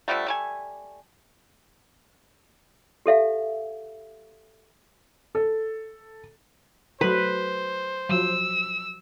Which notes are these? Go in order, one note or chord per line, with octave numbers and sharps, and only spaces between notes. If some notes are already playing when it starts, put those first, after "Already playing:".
D3 F3 G3 A3
G3 A3 G#5
G4 A4 E5 F5
A4
F#3 A3 B4 C5
F3 F#3 E6